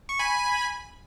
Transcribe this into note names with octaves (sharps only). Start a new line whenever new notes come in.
C#6
G#5 B5